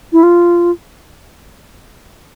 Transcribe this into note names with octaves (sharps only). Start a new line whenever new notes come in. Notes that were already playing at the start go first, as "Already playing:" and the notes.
E4
F4